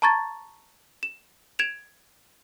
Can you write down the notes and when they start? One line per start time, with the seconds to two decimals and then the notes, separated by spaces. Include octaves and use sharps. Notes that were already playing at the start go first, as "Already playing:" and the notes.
0.02 A5 A#5 C#6 G#6 A6
1.03 E7
1.59 G#6 D7 E7 F7